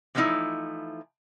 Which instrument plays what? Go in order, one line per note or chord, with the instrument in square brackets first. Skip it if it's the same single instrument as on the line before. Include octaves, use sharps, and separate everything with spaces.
[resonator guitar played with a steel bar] E3 F3 A3 C4 D#4 E4